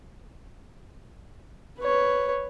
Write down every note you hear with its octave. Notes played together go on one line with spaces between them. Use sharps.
B4 C#5